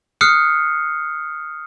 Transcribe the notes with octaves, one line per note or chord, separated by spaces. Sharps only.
D#6 F6 F#6 C7 C#7